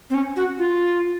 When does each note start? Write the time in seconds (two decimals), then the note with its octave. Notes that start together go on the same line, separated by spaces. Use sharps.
0.10 C4
0.14 C#4
0.36 F#4
0.59 F4